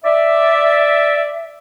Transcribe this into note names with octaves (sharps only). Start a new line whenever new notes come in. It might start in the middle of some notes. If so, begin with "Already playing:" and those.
D5 E5